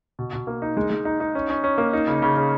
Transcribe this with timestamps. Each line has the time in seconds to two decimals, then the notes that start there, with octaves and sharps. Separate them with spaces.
0.19 B2
0.33 B2
0.47 A#3
0.62 D#4
0.77 G#3
0.90 G#3
1.05 D#4
1.20 D#4
1.35 C#4
1.50 C#4
1.64 C#4
1.78 A#3
1.93 D#4
2.07 C#3
2.22 C#3
2.37 C#3